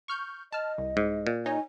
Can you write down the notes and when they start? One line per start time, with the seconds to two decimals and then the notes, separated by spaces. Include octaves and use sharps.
0.08 C#6 F6 G6
0.53 D#5 A5 F6
0.78 C2
0.97 G#2
1.27 A#2
1.46 D#4 C#5 D#5 G#5